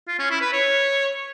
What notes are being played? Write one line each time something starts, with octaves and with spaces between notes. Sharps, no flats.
F4
C#4
E4
B4
C#5